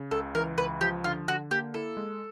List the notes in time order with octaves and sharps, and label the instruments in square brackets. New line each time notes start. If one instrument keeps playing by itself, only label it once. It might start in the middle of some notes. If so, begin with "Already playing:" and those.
Already playing: [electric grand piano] C#3
[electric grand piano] C#2 [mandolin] A4
[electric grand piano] E3 [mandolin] A#4
[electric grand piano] C#2 [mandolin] B4
[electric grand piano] F3 [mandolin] G4
[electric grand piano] D3 [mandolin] F4
[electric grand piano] D3 [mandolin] F#4
[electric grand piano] A#3 [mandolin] G4
[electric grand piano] E4 [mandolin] A4
[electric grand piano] G#3